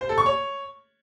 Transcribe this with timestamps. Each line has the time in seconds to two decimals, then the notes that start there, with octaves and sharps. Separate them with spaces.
0.01 C5
0.09 A4
0.18 C#6
0.26 C#5